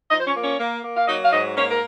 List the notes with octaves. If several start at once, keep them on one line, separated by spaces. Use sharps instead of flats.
F3 D#4 D#5
C5
C#4 C#5
A#3
C#4 C#5
A#3
A#3
F5
F#3 D#4 D#5
F5
G#2 D#4 D#5
A#3 C#4 C#5
A#4